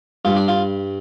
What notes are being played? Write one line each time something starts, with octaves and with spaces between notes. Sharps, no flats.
G2 G3 F4
D4
F4